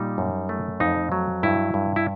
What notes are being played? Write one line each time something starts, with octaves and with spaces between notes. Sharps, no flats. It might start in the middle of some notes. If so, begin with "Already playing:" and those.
Already playing: A#2 G3 D#4
F#2
A3
F2 D#4
F#3
G2 E4
G2
E4